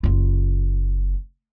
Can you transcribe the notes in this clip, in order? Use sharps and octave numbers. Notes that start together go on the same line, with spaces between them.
F#1 F4